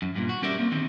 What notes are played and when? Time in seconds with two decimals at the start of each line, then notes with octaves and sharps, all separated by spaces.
0.02 F#2
0.15 G2 A#2
0.29 F#4
0.42 G3 C#4 G4 A#4 D5 E5
0.59 A#3 C4
0.71 D3 D#3 C4